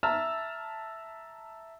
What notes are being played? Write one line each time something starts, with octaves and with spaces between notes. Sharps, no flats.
E5 A5 A#5 E6 F6